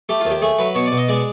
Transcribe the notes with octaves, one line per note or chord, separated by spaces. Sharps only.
A3 G4
F4
D#2
G4
A3 G#4
F#3 B4
B2 C#5
D5
B2
D#5
G#3 D5